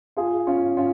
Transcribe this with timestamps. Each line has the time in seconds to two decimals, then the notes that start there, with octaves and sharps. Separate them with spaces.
0.17 F4 G#4
0.47 C#4 F4
0.77 C#4 F4